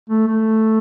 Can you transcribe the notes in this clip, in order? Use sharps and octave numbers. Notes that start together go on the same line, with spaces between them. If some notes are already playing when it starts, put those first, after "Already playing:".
A3
A3